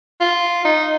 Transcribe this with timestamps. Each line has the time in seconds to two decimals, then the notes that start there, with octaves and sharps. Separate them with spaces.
0.20 F4
0.65 D#4